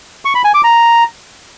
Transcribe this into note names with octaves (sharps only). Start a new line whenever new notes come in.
C#6
B5
G#5
D6
A#5